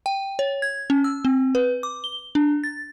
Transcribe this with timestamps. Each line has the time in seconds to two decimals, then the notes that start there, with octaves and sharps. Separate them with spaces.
0.06 G5
0.39 C#5
0.62 G#6
0.90 C#4
1.04 E6
1.25 C4
1.55 B4
1.83 D6
2.04 G7
2.35 D4
2.64 A6